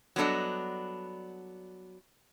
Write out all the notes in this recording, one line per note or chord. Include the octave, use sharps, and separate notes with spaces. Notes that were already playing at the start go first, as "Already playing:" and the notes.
F#3 G3 B3 D4 A4 D#5